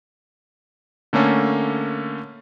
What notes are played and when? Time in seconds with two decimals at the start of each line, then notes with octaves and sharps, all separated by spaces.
1.13 D3 A3 A#3 C#4